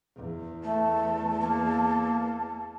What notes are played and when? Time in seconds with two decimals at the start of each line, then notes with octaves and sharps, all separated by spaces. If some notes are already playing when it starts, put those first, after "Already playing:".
0.16 E2
0.64 A3 A5
1.41 A#3